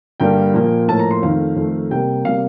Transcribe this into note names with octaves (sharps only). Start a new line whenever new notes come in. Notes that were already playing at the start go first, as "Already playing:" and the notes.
G2 D3 G3 A#3 G5
A#2 F3 A#3
A2 F3 A#3 A5
A#5
C6
F2 D#3 A3 F5
F2 D#3 A3
C3 G3 A#3 G5
C3 G3 A#3 F5